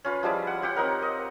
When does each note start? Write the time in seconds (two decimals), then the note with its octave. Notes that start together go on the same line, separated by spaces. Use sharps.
0.05 C#4 F4 B4
0.23 F3 G3 G#3 E4
0.47 F#5
0.62 F4 G4 C#5 F#5
0.76 C4 D#4 A#4
1.02 D#5